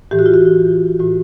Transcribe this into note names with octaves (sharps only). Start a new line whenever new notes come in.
A2 E3 G4
F#4
F4
F#4
A2 E3 F#4